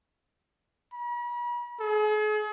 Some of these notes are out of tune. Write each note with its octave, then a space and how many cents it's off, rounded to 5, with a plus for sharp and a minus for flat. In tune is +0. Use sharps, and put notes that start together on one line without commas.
B5 -45
G#4 +40